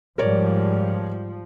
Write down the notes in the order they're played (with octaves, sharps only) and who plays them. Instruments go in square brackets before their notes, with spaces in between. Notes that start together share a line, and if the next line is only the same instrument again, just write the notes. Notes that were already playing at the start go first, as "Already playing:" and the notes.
[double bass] G#2 G3 [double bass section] F3 [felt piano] A#4 C#5 D5